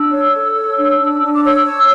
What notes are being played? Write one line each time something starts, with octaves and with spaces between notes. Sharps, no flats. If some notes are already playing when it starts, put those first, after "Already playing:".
Already playing: D4 E6
C#5
A4
C#5
D4
D4
D4
D6
C#5 E6
C#5